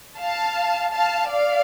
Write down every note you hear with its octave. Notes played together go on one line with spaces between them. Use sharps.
F5 A5
F5 A5
D5 F5